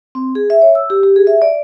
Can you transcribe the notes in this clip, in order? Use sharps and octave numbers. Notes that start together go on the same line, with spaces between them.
C4
G#4
E5
C#5
E6
G4
G4
G#4
E5
D5